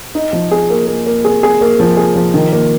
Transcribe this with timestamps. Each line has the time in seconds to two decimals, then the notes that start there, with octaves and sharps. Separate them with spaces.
0.15 D#4
0.33 F3
0.51 G#4
0.70 A#3
0.87 A#3
1.06 A#3
1.25 G#4
1.43 G#4
1.61 A#3
1.80 F3
1.97 G#4
2.16 F3
2.34 D#3
2.52 A#3